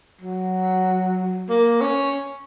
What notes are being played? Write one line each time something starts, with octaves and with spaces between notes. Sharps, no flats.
F#3
A#3
C#4